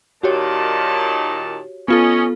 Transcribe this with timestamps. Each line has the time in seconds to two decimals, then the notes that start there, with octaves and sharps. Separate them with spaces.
0.23 A#2 D#3 F#4 G4 C#5 A5
1.88 B3 C#4 F4 A4 D#5